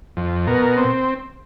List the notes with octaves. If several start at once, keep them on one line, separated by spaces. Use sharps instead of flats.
F2
B2 A#4
C4